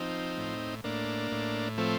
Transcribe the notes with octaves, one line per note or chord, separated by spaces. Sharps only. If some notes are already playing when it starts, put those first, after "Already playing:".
Already playing: F3 C4 D#4
A2
A2 A#3 D4
A2
F3 A3 C4